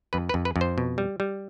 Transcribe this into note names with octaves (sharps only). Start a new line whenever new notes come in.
F2 B4
B4
F2
B4
F2
C5
B2
G3
G3